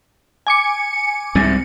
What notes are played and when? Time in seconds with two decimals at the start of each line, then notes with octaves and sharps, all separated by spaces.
0.47 G#5 D6 C#7
1.35 C2 G#2 C3